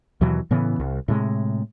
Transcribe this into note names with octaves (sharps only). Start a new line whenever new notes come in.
D#2 B2 E3 F#3
A2 C#3 E3 B3
C2
A2 C3 G#3